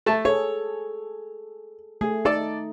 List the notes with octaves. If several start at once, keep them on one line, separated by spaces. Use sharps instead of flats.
A3 A5
G#4 A4 C#5
A3 G#4
D#4 A4 D5 A5